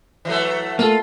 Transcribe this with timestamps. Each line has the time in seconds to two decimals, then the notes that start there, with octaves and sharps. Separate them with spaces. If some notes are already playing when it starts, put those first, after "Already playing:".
0.25 E3 F#3 A3
0.79 A3 A#3 F4 A4